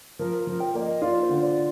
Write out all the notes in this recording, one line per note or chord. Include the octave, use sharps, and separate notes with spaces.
F3 A#4
A#4
F3
G5
A#3 D5
D#5
F4 D5
A#4
C5
D3
D5